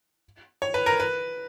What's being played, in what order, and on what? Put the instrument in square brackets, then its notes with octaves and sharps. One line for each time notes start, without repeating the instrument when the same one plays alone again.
[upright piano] C#5
B4
A#4
B4